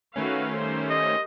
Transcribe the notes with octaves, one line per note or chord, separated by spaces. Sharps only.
D#3 A3 C#4 F#4 B4 F5
G3 A#4 C5
D#5